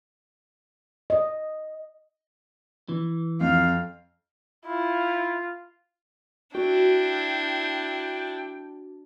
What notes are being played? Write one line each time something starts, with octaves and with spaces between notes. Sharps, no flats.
D#5
E3
F2 F5
E4 F4
D4 E4 F#4 G5